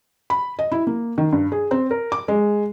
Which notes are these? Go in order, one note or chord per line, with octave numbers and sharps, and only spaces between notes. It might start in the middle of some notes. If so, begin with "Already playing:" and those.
B5
D#5
E4
A#3
D#3
G2
G#4
C4
A#4
D6
G#3